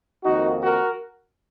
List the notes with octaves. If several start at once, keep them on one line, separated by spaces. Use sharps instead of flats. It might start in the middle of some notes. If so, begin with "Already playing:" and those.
F2 D#3 A#3 D#4 F#4
F#4 A#4